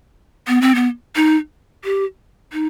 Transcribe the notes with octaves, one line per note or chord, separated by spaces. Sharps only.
B3
C4
B3
D#4
G4
D#4